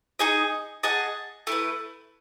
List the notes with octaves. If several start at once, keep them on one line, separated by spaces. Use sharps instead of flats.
D#4 G#4 D#5
G#4 D#5 F#5 A5
A3 E4 B4